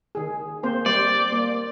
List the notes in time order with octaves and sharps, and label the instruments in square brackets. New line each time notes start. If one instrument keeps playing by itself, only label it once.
[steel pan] D#3 G#4
A#3 C4 C5
[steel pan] G3 C5 [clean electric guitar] D5
[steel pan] A#3